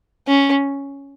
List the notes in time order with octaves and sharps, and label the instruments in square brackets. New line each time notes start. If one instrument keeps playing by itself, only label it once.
[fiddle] C#4